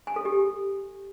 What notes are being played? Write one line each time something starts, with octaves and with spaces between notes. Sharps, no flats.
G#5
A4
G4